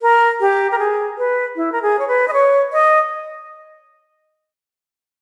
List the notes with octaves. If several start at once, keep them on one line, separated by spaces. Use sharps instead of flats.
A#4
G4
A#4
G#4
B4
E4
A#4
G#4
C#5
B4
D#5
C#5
D#5